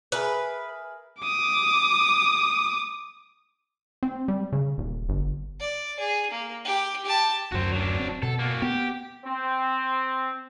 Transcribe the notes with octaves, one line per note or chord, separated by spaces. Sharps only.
G#4 A#4 B4 E5
D6 D#6
C4
G3
C#3
D#1
G1
D5
G#4
A#3
G4
G4 A5
D1 F#2 F#4 C5
F#3 D4
C4
B2 A4
A#3 F#4
B3 G4
C4